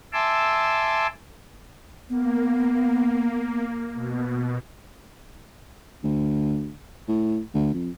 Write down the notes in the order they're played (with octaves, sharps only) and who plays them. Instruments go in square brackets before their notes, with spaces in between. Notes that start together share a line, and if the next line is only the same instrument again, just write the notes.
[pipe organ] E5 G#5 A5 C6 D6 E6
[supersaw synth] A#3 [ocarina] B3
[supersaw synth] B2
[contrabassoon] D2
A2
D2
F2